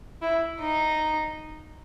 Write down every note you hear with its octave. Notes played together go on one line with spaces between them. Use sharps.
E4
D#4